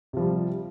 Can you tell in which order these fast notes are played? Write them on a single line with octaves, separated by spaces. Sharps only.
C3 F3 G3